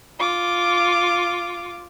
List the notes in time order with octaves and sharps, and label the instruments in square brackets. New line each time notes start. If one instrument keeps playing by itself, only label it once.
[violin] F4 D6